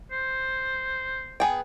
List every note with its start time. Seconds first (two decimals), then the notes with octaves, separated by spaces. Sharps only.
0.12 C5
1.40 B3 G#4 G5